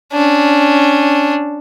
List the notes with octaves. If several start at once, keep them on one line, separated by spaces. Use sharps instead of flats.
C#4 D4